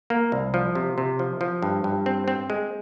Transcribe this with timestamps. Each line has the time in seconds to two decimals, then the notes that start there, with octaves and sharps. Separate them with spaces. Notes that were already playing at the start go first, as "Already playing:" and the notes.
0.10 A#3
0.32 C2
0.54 F3
0.75 C3
0.98 C3
1.19 F3
1.41 F3
1.62 G2
1.84 G2
2.06 C4
2.28 C4
2.50 G#3